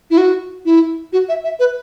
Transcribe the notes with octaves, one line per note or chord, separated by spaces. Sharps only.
E4
F#4
E4
F#4
E5
E5
B4